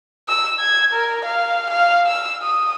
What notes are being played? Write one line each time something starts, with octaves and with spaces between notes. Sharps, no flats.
E6
G#6
A#4
F5
F5
E6
D#6